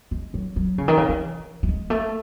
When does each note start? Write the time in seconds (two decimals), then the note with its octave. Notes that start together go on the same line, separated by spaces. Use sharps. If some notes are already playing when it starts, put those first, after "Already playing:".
0.11 G#3
0.34 F#3
0.56 F#3
0.78 C#3
0.88 D#3
0.97 C#3
1.09 E3
1.63 A3
1.68 G#3
1.90 A3